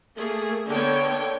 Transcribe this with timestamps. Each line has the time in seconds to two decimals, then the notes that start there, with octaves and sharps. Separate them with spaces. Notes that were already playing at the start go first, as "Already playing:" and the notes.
0.16 A3 A#3 G#4
0.67 D3 A#3 B3 C#5 G5